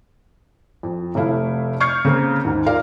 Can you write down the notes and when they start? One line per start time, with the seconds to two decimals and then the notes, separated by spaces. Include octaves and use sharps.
0.83 F2
1.15 F1 A3 E4 F5
1.80 C#6 F6 G6 G#6 C7 C#7
2.05 C#3 A#3 C4 A#4
2.45 D#2 G#2
2.66 F4 A#4 D5 F5